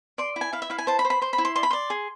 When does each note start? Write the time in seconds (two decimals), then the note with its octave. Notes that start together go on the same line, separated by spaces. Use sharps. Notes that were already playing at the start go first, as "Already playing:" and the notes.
0.18 D5 C6
0.36 E4
0.41 G#5
0.53 E4 F5
0.62 E5
0.70 E4 F5
0.78 G#5
0.87 C5 A5
0.99 B5
1.05 C5
1.10 B5
1.22 C5 C6
1.33 B5
1.38 E4
1.45 C6
1.56 D5 C6
1.63 B5
1.71 D5 C6
1.90 G#4